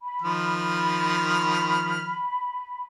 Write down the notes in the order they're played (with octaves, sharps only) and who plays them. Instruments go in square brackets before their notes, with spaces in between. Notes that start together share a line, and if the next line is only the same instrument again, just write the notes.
[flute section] B5
[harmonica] D#3 F3 F6